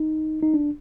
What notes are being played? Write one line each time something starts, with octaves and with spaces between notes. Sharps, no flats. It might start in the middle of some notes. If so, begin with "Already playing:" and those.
Already playing: D#4
D#4
D4